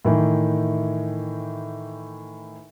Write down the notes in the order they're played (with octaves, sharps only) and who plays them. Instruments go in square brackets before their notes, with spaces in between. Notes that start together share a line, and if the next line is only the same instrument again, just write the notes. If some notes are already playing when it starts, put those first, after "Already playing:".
[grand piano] A2 D#3 E3